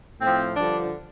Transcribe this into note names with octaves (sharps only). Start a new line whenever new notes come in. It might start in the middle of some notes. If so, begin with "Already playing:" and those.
A2 F3 C4
G2 D3 F3 D4